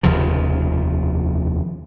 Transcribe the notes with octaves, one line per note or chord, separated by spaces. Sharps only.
F1 D#2 C#3 F3